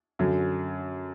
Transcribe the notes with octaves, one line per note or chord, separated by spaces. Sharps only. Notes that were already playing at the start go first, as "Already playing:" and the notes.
F#2 D3 F#3